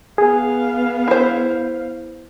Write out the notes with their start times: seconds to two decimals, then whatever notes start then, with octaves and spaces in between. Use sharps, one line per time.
0.18 B3 G#4 F5
1.08 E4 C5